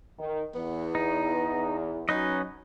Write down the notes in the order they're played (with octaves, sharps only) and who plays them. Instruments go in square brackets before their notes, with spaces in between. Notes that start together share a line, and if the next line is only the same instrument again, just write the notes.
[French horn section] D#3
[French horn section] E2 [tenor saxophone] B3
[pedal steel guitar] D#4
[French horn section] F#3 [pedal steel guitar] C#4 B4 D#5 [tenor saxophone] D#4